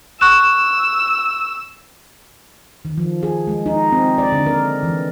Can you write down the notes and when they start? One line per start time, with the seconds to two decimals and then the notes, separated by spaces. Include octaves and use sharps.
0.21 C#6 E6 F#6 E7
2.85 D#3
2.98 F3
3.23 G#4
3.47 G#3
3.66 D#4
3.92 C4
4.18 D5
4.32 D3
4.46 A#4
4.83 E3